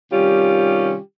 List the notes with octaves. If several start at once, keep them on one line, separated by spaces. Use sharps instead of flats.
C3 D#3 G3 C#4 F4 G4